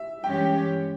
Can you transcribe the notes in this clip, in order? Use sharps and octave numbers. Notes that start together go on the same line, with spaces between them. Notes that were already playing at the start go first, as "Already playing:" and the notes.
Already playing: E5
G2 E3 G#3 C#4 G4 G5